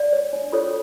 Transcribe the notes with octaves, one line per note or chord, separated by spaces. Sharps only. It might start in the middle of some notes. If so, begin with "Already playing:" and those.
Already playing: D5
C#5
D4
F4 A4 C#5